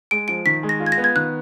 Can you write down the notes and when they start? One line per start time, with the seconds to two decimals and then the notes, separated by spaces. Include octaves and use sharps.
0.11 G#3 D7
0.28 F3 D7
0.45 D#3 B6
0.63 G#3
0.69 A#6
0.80 F4
0.86 G#6
0.92 A#6
0.98 B3
1.04 G#6
1.15 D#3 F#6